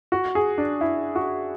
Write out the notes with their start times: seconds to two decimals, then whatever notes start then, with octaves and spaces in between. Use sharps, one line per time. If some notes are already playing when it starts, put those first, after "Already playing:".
0.12 F#4
0.35 G#4
0.58 D4
0.81 E4
1.16 F#4